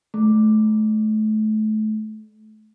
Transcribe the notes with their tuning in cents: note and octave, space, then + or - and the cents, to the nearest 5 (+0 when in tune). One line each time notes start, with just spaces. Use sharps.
A3 -30